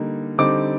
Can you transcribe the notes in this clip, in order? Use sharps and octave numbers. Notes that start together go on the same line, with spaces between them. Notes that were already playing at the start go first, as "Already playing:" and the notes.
Already playing: D3 G3 A#3 D#4
D3 G3 C4 D#4 D6